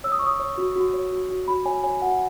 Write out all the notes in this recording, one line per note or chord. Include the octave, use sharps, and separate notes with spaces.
C#5 E6
D#6
C#6
C#5 D#6
C#5
F#4
F#4
C#5
F#4
F#4
F#4 B5
C#5 G#5
C#5 G#5
F#4 F#5